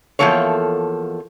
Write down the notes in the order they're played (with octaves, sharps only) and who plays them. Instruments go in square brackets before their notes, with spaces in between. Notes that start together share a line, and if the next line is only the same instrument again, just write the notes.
[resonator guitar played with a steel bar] E2 C3 F3 A#3 A4 C#5